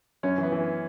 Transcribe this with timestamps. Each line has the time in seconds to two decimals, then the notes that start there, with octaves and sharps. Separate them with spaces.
0.23 F#2 C#4
0.38 E3 B3
0.52 E3